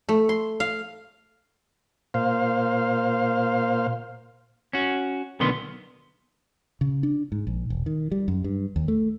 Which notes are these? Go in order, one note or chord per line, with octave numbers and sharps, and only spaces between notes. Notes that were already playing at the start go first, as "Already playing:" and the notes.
A3
C6
F5
A#2 C5 F5
C#4 F#4
B1 B2 D3 D#3 B3 C6
C#3
D4
G#2
A#1
E1
D#3
G3
F#2
G2
D#2
A3